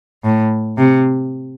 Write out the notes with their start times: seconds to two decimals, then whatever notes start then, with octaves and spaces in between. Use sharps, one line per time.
0.23 A2
0.78 C3